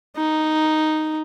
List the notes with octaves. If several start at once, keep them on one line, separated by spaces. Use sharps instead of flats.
D#4